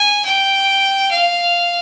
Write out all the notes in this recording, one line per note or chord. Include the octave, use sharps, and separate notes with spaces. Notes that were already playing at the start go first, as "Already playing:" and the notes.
Already playing: G#5
G5
F5